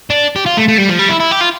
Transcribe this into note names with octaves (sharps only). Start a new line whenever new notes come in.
D4
G4
F4
A3
A3
G3
F3
G3
E4
E4
G4
F4